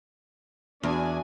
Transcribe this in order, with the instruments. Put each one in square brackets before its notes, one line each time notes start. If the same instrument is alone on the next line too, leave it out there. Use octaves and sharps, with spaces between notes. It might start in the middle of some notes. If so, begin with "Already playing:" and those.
[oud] E2 [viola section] D4 F#4 G#5